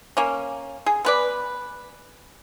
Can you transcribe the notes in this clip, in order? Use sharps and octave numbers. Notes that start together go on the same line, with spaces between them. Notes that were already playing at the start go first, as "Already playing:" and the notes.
A#3 C#4
G#4
B3 B4 D5